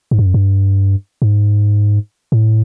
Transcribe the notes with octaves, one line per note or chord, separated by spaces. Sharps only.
G#2
G2
F#2
G2
G#2
A2